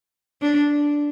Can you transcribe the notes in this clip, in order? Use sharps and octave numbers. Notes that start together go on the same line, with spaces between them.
D4